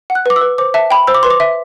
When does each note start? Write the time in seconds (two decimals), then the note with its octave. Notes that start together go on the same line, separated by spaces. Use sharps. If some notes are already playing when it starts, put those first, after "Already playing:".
0.10 F#5
0.15 F#6
0.26 B4 D6
0.36 E6
0.41 B4
0.58 C5 D6
0.74 E5 A5
0.91 G5 B5
1.07 C5 E6
1.15 D6
1.23 B4 C6
1.30 D6
1.40 E5